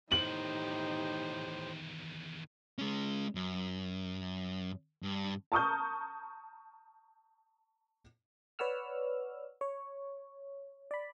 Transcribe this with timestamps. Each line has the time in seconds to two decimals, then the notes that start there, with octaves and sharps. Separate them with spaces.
0.12 E2 A2 D#3 D#4 G4 C5 F#7
2.79 G#3 C#4
3.35 F#2
5.03 G2
5.52 A5 A#5 C#6 D#6 F6 G6
8.59 B4 C#5 D5 F#5 E6 F6
9.61 C#5
10.91 D5 B5